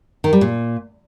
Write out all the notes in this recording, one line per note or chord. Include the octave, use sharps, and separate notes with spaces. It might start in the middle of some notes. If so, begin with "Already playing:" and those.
D#3
G3
A#2